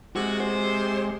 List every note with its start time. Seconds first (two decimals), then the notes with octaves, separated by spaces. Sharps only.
0.16 C3 G#3 F#4
0.40 C5